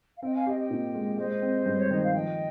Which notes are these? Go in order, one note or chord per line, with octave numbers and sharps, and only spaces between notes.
F5
C4 D#5 G5
F5 G#5
G4 D#5 G5
D#5 G5
A#2
G#3
G#3 C5 D#5
C4
G2
C#5
D#3 D#5
F5
F3 D#5 G5